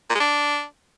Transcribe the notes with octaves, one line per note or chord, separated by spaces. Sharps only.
A#2
G#3
D4